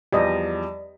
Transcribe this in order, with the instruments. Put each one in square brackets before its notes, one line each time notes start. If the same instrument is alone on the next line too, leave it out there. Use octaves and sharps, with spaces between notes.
[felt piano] E2 F3 G3 [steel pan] G4 D#5 [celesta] D5